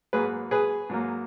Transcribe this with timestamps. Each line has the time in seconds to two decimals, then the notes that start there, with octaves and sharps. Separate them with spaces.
0.13 G#2 F#3 A#3 G#4 B4
0.51 G#4 B4
0.89 G#2 F#3 A#3